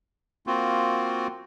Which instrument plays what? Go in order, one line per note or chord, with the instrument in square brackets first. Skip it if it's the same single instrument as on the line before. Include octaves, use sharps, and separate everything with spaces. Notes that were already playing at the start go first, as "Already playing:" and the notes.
[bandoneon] A#3 C4 F4 F#4